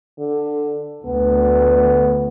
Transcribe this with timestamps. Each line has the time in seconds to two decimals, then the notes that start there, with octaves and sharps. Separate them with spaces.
0.19 D3
1.06 D2 B3